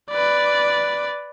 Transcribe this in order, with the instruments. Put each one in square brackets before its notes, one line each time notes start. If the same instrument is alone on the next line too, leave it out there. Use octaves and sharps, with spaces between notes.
[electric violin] B4 D5